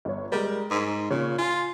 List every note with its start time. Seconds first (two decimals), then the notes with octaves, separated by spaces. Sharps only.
0.05 G1 C#5
0.32 G3 G#3 A#4
0.71 G#2
1.10 A#2 C#3 C#5
1.38 F4 G#5